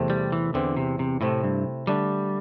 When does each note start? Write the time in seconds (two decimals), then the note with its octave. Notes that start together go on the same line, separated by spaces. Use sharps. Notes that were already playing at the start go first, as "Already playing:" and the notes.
Already playing: E2 C3 A3 C4
0.10 G3
0.32 E3
0.54 E2 D3 E3 C4
0.77 C3
0.99 C3
1.21 A2 C3 A3 C4 E4
1.43 G2
1.87 D3 G3 A3 D4